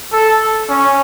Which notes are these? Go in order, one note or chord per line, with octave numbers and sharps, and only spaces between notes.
A4
C#4